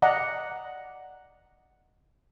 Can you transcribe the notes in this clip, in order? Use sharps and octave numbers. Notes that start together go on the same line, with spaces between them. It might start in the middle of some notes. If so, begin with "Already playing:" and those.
D5 D#5 F#5 A#5